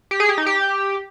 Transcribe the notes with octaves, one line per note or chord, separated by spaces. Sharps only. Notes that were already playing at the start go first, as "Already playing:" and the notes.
G4
G#4
G4
D#4
G4